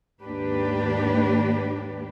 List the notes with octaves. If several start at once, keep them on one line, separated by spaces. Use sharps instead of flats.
D#2 G#2 A#3 D4 G4 B4